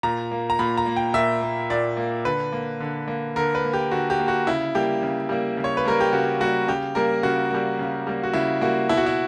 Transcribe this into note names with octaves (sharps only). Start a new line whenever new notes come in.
A#2 A#5
A#3
A#5
A#2 B5
A#5
A#3
G5
A#2 E5
A#3
A#2 D5
A#3
D3 B4
A#3
D3
A#3
D3 A#4
B4
A#3
G4
D3 F#4
G4
A#3
F#4
C#3 E4
G3 A#3 G4
C#3
G3 A#3
C#3
C#5
B4
G3 A#3 A#4
G4
C#3 F#4
G3 A#3 F#4
C#3 G4
G3 A#3 A#4
C#3 F#4
G3 A#3
C#3
G3 A#3
F#4
C#3 E4
G3 A#3 F#4
B2 E4
F#4
E4